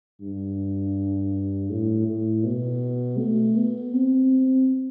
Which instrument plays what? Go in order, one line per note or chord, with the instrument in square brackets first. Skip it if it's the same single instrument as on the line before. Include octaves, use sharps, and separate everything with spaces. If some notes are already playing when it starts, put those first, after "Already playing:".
[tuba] G2
A2
A2
B2
A3
B3
C4